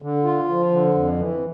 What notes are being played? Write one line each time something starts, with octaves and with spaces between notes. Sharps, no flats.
D3
F4
F3
D3
F2
E3